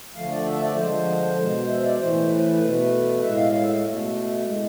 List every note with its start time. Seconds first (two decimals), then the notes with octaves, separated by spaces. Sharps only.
0.15 D3 F3 A3 F5
0.30 D5
0.45 E5
0.61 D5
0.76 D3 F3 G#3 C5
1.37 B2 G#3
1.68 E5
1.83 D5
1.99 A2 E3 A3 C5
2.29 B4
2.60 B2 A3
3.21 A2 G#3 E5
3.36 F5
3.52 F5
3.61 E5
3.72 F5
3.83 B2 A3
4.44 A2 G#3